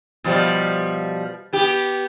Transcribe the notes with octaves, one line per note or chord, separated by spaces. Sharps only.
B2 F3 G3
B3 G4